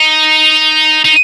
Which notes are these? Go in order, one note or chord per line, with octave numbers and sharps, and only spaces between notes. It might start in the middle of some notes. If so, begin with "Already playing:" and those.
Already playing: D#4
D#4